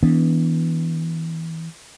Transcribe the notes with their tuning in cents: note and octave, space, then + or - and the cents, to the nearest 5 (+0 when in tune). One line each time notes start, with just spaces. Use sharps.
E3 -20 B3 -10 D4 -45